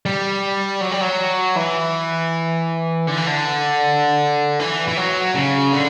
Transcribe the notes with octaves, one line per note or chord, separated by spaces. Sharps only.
G3
F#3
G3
F#3
E3
D3
E3
D3
E3
E3
F#3
C#3
D3